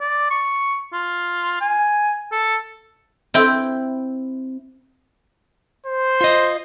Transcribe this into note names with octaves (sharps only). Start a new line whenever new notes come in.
D5
C#6
F4
G#5
A4
C4 E4 G5
C5
F4 D#5